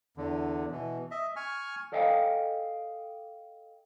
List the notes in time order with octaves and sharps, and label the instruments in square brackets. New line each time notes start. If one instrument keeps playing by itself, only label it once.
[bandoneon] E2 D3
B2 E3
D#5 E5
G#5 C#6 F6
[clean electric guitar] A4 D5 D#5 F5 G5 G#5